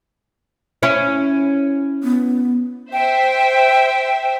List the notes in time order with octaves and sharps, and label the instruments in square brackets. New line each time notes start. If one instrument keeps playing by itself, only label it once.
[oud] C#4 E4 C#5
[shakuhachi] B3
[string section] C5 E5 [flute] G5